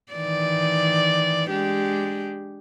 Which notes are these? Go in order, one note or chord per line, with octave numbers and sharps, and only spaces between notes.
D#3 E3 D5
G#3 D4 G4